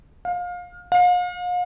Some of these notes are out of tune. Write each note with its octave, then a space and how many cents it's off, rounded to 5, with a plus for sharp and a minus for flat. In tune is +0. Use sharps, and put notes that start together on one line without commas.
F5 +25
F5 +40